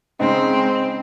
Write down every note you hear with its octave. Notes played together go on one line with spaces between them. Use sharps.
C#3 G#3 C4 D#4